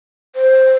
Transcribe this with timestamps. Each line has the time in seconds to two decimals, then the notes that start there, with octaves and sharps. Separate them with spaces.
0.35 C5